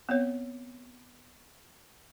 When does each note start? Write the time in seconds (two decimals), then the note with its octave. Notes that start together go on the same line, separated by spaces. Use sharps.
0.09 B3 C4 C#5